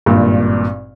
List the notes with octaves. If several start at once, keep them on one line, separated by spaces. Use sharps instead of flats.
G#1 G2 A#2